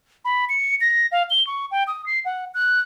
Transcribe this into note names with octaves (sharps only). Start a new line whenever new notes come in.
B5
C#7
A#6
F5
G7
C#6
G5
D#6
C7
F#5
F#6